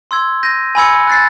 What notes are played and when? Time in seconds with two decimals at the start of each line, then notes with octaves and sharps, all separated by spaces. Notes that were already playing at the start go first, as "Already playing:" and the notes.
0.11 C6 E6 G#6
0.43 G6 A#6 D#7
0.75 G#5 B5 E6 G#6 C#7
1.07 F#6 A6 C7